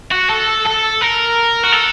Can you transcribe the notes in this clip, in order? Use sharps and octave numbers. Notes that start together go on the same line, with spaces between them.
F#4
A4
A4
A#4
F#4
A4